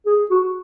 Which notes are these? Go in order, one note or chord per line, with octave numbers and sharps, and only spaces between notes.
G#4
F#4